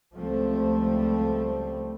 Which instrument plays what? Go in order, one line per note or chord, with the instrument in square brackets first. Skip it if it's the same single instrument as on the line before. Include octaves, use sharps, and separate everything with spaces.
[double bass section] C#2 F3 G3 A3 C4